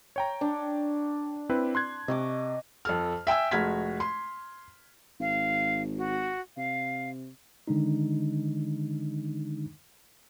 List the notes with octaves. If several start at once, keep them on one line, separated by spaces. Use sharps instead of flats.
C#5 G5 A#5
D4
C4 E4 B4
C6 F#6 G#6
C3 D#5 C#6 D6
F2 A4 F6
E5 G5 G#5 E6
F1 G#3 F#4 F6 G#6 B6
C6
G#1 F5
F#4
C3 F5
D3 D#3 G#3 D4 D#4